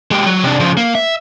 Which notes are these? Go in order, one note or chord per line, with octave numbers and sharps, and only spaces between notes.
G#3 G4
F#3
C3 D4
C#3 F3
A#3
E5